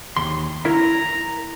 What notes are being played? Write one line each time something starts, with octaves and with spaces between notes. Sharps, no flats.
D#2 C6
E4 A#4 E5 A#5